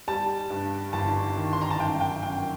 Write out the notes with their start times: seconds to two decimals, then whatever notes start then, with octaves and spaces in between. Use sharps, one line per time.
0.08 G3 A5
0.50 G2
0.93 G1 A5
1.37 D#3
1.53 C6
1.61 A#5
1.70 A5
1.80 F#2 G5
2.01 G5
2.23 F#2 G5